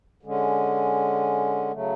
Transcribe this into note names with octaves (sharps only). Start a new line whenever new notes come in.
D3 G#3 C#4
C#3 F#3 A3